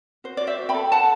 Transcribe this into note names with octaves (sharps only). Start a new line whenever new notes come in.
F#4 C5
F#4 D5
C5 E5
F#4
G5 B5
A4
A4 F#5 A5